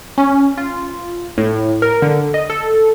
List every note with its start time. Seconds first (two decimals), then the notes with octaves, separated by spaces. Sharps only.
0.18 C#4
0.58 F4
1.38 A2
1.82 A#4
2.02 D3
2.34 D#5
2.50 A4